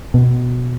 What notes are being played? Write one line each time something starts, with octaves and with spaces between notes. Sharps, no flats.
B2